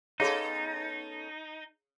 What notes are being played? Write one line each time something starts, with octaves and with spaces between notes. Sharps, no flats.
B3 C#4 D#4 G#4 A4 C#5 F5